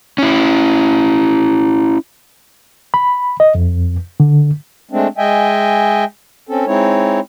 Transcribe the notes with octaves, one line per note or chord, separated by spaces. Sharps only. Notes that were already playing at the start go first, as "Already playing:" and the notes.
C#4 E4
B5
D#5
F2
D3
G#3 A3 C4 D4
G#3 D#5 E5 G5 G#5
C4 C#4 A4
G#3 C4 D#4 E4 C#5